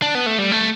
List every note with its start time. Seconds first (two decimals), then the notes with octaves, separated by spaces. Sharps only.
0.02 D4
0.15 B3
0.26 A3
0.39 G3
0.52 A3